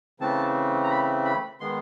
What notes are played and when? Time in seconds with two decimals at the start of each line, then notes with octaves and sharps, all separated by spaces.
0.20 C#3 E3 A3 C4 A5
0.84 A#5
0.90 B5
1.25 B5
1.60 D#3 G#3 B3 C6